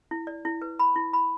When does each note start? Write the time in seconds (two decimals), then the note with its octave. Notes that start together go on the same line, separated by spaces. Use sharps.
0.11 E4
0.27 D5
0.45 E4
0.62 B4
0.79 B5
0.96 E4
1.13 B5